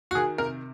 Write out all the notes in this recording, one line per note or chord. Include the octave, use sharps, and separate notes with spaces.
F#4
D#3 G#4
C3 A#4